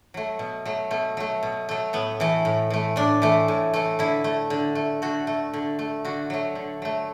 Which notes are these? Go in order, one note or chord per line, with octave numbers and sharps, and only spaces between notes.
F#3 A3
B2
F#3 A3
B2 A3
F#3 A3
B2
F#3 A3
A2 B3
E3 A3
A2
E3 A3
A2 D4
E3 A3
A2
E3 A3
D3 E4
A3
D3
A3
D3 F#4
A3
D3
A3
D3 F#4
F#3 A3
D3
F#3 A3